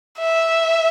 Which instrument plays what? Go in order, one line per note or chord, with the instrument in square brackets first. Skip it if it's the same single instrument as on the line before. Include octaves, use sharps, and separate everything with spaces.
[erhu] E5